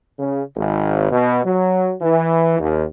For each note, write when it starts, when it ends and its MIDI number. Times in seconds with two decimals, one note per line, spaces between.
0.19 0.42 49
0.57 1.09 32
1.11 1.40 47
1.45 1.94 54
2.02 2.55 52
2.58 2.83 39